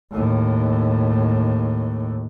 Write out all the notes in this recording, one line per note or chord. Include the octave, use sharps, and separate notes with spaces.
D#2 A2